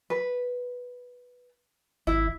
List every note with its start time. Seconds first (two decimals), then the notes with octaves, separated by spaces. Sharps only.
0.10 B4
2.07 G#1 E4